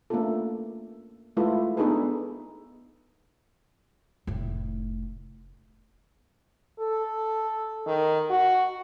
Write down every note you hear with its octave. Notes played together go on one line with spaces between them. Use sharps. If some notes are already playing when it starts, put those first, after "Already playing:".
A3 A#3 C#4 D4 F4 A4
G#3 A3 E4 F4 A4 B4
B3 D4 D#4 G#4 A4 B4
F1 A2
A4
D#3
F#4